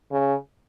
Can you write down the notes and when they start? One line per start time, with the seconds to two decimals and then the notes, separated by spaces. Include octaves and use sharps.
0.12 C#3